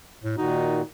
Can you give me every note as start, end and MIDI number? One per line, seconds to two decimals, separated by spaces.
0.24 0.37 45
0.37 0.81 46
0.37 0.81 51
0.37 0.83 63
0.37 0.81 66